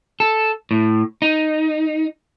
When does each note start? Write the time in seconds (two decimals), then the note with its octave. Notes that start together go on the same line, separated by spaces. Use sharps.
0.20 A4
0.71 A2
1.22 D#4